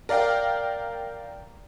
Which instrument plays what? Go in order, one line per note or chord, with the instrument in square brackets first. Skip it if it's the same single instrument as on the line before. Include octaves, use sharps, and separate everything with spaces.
[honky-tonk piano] A#4 D5 F5 G5